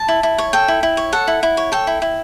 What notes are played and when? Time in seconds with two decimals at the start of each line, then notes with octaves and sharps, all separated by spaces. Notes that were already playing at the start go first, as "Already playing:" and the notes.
Already playing: A5
0.08 E4
0.23 E4
0.38 C#5
0.53 A4 G5
0.68 E4
0.83 E4
0.97 C#5
1.13 A4 F#5
1.28 E4
1.43 E4
1.57 C#5
1.72 A4 G5
1.87 E4
2.02 E4